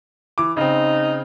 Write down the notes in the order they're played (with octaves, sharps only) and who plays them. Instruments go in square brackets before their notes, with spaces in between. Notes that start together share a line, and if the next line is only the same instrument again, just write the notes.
[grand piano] E3 D6
[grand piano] C#3 C4 [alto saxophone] D#4